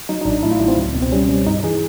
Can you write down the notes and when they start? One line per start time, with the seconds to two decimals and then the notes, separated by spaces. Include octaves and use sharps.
0.09 F#3 D#4
0.21 D#4
0.25 A1 D4
0.43 A2 E4
0.51 F4
0.60 F#3 E4
0.68 C4
0.77 C#2
0.95 B2
1.02 C4
1.12 G3 C#4
1.29 G3
1.47 G2 D#4
1.63 E3 G#4